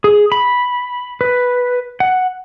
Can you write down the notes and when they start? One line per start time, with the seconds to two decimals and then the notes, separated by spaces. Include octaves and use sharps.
0.04 G#4
0.32 B5
1.21 B4
2.00 F#5